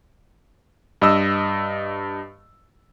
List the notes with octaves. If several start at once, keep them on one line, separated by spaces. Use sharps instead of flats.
G2 D#5 E6